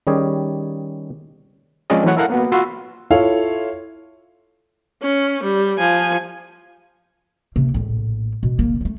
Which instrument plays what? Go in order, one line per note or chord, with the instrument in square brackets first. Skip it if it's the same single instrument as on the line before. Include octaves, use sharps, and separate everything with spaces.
[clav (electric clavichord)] D#3 G3 C#4 G4 G#4
[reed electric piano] F3 G#3 C4 C#4 D5 D#5
E3 F#3 A3 B4 C#5 F#5
E4 A4 A#4 F5 F#5
A#3 B3 F#4
F4 F#4 B5 C6 E6
[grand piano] E4 F4 A4 C#5 F5
[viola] C#4
G3
F3 G#5
[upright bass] C3 A#3
A#1 A2
B2
F#1 A#3
G#3 A3